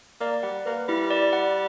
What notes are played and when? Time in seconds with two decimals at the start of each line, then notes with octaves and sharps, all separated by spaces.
0.20 A#3 D5
0.43 G3 F#5
0.66 A#3 B4
0.89 G3 E4
1.11 D5
1.33 F#5